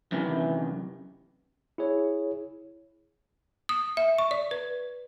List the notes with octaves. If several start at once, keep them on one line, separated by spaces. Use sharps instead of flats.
F#2 C3 D#3 E3
E4 G#4 C#5
D#6
E5
C#6
D5
B4